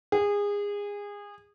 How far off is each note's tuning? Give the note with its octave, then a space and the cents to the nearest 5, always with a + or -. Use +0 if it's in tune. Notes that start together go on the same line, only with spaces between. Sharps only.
G#4 -25